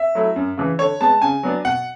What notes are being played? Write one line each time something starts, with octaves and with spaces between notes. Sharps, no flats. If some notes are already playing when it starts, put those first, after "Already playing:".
Already playing: E5
F#3 A3 E4
F#2
C#3 E3
D3 C#5
G#3 B3 A5
C#3 G#5
F#3 B3 D4
B2 F#5